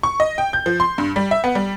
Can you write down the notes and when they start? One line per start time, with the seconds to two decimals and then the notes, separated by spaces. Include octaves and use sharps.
0.03 C#6
0.20 D#5
0.38 G5
0.53 G6
0.66 F3
0.80 C6
0.98 G2
1.16 G3
1.31 E5
1.44 B3
1.55 G3